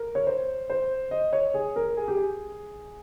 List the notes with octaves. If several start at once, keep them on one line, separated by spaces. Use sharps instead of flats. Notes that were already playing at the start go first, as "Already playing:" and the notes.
Already playing: A#4
C#5
C5
C5
D#5
C#5
G#4
A#4
G#4
G4
G#4